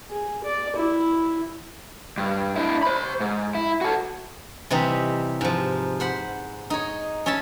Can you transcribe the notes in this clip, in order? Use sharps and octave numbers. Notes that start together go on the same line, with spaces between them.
G#4
D5
E4
G2
D4 E4
C5 B5
G#2
E4
F#4 A4
C3 E3 G3 D#4
G#2 F3
C5 F#5 B5
D#4 C#5
C#4 C#5 E5 A5 B5